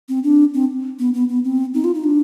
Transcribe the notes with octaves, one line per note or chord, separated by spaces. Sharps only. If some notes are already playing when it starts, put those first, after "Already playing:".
C4
D4
C4
B3
B3
B3
C4
D#4
F4
D#4
D4